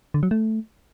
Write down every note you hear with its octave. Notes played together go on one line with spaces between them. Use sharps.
D3
F#3
A3